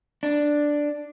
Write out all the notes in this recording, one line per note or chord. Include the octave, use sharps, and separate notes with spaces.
D4